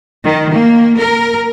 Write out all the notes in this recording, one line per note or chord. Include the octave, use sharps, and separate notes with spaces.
D#3
A#3
A#4